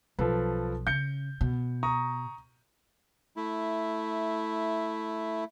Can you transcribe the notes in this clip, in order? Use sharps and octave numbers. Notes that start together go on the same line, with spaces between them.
B1 F3 A4 B4
C#3 G6 C#7
B2
A#5 C#6 D#6
A3 E4